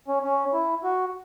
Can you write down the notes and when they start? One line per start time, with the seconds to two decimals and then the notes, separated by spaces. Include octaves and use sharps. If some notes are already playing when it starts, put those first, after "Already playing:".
0.08 C#4
0.23 C#4
0.53 E4
0.84 F#4